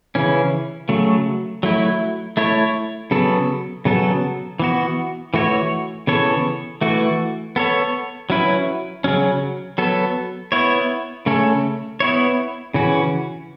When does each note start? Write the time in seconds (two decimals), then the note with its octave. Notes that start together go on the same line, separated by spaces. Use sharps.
0.15 C#3 E3 C#4
0.89 C#3 F#3 A3
1.63 F#3 A3 E4
2.37 A3 E4 C#5
3.11 C#3 F#3 B3 A4
3.85 C#3 F#3 B3 A4
4.59 E3 B3 F#4
5.34 E3 A3 F#4 C#5
6.07 C#3 E3 B3 A4 C#5
6.81 E3 A3 F#4
7.56 B3 A4 C#5
8.30 F#3 C#4 E4 B4
9.04 C#3 F#3 C#4
9.78 F#3 B3 A4
10.52 B3 E4 C#5
11.26 C#3 A3 C#4 A4
12.00 B3 E4 C#5
12.74 C#3 E3 C#4 F#4